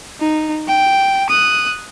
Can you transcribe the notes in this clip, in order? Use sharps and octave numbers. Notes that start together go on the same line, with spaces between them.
D#4
G5
D#6 F#6